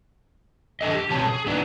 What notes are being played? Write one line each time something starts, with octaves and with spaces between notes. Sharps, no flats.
E2 D3 A4 D#5
G4
B2 F3 C4 C#5 A5
G#4
B3 D4 D#4 F#4 B4